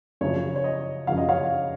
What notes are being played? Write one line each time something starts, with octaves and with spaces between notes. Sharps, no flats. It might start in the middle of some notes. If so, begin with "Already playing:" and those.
F#2 C#3 F3 C#5
C#5
D#5
F#2 C#3 F3 F5
D#5
C#5 F5